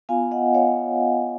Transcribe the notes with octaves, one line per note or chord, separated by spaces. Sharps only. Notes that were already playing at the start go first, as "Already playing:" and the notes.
B3 F4 F5 G#5
D#5 F#5
C#5 F5